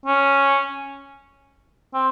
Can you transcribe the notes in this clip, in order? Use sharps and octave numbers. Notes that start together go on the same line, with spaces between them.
C#4
C4